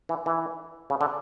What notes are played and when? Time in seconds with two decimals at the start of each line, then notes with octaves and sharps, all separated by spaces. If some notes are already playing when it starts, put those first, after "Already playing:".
0.09 E3
0.26 E3
0.90 C#3
1.01 D3